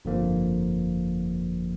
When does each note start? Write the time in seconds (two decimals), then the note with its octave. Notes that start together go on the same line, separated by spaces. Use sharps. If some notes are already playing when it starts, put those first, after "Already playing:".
0.05 G1 F2 D3 F3 A#3